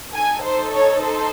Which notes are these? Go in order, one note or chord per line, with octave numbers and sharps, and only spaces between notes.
D#4 A4 G#5
C5
C#5
C5